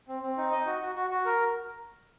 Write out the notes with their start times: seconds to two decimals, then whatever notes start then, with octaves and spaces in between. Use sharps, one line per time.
0.08 C4
0.23 C4
0.37 D#4
0.51 D#5
0.66 F#4
0.81 F#4
0.95 F#4
1.10 F#4
1.25 A#4